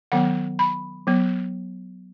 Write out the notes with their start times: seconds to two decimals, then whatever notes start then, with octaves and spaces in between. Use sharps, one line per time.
0.12 D#3 F#3 B3 F#5
0.59 B5
1.07 F#3 B3